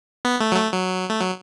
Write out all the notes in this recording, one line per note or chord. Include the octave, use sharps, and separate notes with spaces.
B3
A3
F#3
A3
F#3
A3
F#3